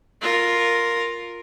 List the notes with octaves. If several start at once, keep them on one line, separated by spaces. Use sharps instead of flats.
F4 A#4